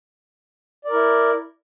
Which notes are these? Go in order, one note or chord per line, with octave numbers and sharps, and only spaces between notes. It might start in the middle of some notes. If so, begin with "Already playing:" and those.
E4 A#4 D5